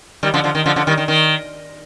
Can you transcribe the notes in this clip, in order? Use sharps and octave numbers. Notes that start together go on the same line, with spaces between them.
D#3 G3
D3 F3
D3 F3
D#3
D3 F3
D3 F3
D#3 G3
D#3
D#3